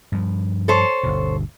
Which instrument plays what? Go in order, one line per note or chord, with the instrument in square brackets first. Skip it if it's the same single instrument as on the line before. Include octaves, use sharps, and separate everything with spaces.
[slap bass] G2 F3
[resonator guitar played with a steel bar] A4 C5 C#5
[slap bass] G1 D2 B2